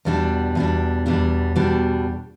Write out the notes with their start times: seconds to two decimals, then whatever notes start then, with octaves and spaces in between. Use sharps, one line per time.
0.05 E2 B2 G3 D4
0.55 E2 B2 G3 D4
1.06 E2 B2 G3 D4
1.56 E2 B2 G3 D4